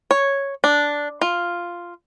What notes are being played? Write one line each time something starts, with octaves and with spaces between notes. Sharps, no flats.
C#5
D4
F4